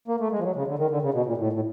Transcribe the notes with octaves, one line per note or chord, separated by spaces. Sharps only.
A#3
A3
G#3
F3
F#3
C#3
D3
D#3
D3
C#3
B2
A#2
A2
A2